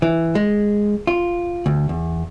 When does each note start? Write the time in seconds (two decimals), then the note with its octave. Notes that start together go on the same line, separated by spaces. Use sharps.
0.02 E3
0.35 G#3
1.07 F4
1.66 D2
1.89 E2